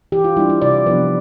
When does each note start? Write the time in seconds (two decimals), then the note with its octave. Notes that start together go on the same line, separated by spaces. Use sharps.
0.12 E3 G4
0.24 F4
0.37 G3 D4 E4
0.50 E4
0.62 C3 D5
0.86 F3 B3 D4 B4